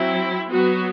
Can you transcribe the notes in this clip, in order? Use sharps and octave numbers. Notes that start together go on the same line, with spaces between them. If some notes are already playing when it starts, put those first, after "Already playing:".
Already playing: F#3 C4 E4
F#3 B3 F#4